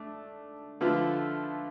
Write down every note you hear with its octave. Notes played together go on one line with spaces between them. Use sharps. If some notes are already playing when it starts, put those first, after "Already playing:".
Already playing: A3 D4
D3 F3 A3 F4 B4